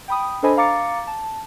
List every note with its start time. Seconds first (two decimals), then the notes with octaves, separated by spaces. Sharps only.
0.08 G5 B5 D#6
0.43 D4 A4 C5 D#5 G#5 B5
0.57 F5 A#5 D6 A6 C#7
1.07 A5